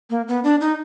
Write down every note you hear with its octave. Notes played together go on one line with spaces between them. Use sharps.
A#3
B3
D4
D#4